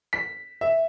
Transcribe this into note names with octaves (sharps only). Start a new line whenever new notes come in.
B6
E5